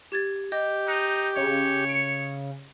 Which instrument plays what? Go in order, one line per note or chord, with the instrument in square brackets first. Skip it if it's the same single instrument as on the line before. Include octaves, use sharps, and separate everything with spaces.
[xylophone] G4 G#6 A6
[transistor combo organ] G4 [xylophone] D#5
[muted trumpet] D#4 [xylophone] F#6
[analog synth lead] C#3 [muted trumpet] C#5
[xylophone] C#7 D7